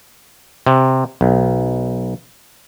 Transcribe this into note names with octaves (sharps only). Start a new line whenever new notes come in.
C3
B1